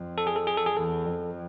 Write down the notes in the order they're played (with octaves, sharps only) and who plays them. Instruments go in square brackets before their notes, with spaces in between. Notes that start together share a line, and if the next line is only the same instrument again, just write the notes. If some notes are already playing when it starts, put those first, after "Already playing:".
Already playing: [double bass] F2
[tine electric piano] A4
G#4
A4
G#4
A4
G#4
[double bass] E2 [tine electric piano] A4
[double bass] F2